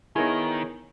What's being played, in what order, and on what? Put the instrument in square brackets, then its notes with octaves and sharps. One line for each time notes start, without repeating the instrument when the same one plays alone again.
[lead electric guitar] D#3 [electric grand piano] B3 D#4 E4 [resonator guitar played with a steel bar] G#4 A#4 C#5